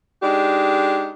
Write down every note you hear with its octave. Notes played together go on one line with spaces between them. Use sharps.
G#3 D4 D#4 G4